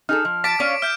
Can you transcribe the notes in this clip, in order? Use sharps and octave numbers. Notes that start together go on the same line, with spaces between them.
D#4 G#4 A4 F6
F3
A5 D6 B6 D7
C#4 D4 C#5 F5
E5 F6 G6 D7